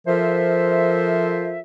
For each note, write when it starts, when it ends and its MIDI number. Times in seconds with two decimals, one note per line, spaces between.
0.07 1.61 53
0.07 1.61 65
0.07 1.61 69
0.07 1.61 70
0.07 1.61 72
0.07 1.61 76